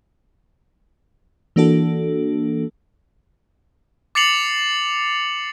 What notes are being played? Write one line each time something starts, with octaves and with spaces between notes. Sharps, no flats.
E3 A#3 D4 F#4 A4
D6 A6 C7 C#7 F7 F#7